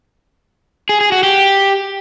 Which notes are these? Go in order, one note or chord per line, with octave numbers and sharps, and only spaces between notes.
G#4
G#4
F#4
G4